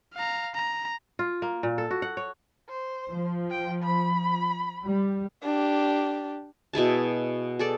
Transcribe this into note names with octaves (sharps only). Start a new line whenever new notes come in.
F5 A#5
A#5
F4
A#3
A#2
A4
F#4
F#5
C#5
C5
F3
G5
B5
G3
D4 G4
B2 E4 G#4 A5
G#4 A4 D5